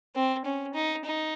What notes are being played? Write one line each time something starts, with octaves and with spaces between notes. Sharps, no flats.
C4
C#4
D#4
D#4